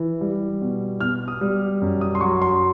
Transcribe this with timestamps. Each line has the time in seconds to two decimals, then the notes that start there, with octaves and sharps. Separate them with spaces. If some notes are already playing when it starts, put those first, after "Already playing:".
Already playing: E3
0.21 G3
0.61 B2
1.00 B2 F6
1.28 D#6
1.41 G3
1.82 F#2
2.01 D#6
2.15 C6
2.21 F#3 C#6
2.42 C6